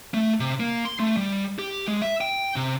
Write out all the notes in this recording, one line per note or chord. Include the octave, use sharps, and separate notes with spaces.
A3
C3
A#3
C6
A3
G3
G4
G#3
E5
G5
C3